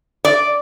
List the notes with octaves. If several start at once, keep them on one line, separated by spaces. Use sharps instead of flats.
D5